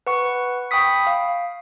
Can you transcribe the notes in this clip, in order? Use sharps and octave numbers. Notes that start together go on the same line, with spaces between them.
B4 F#5 C#6
G5 B5 C#6 D#6 B6
F5